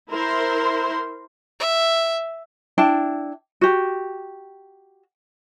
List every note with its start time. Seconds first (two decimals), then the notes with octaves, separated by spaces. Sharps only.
0.10 E4 A#4 C5 C6
1.60 E5
2.78 D4 E4 G5 A5
3.61 F#4 G4